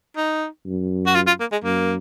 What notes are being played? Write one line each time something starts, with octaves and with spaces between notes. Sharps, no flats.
D#4
F#2
F#4
F4
F4
A#3
G#3
F#2 A#3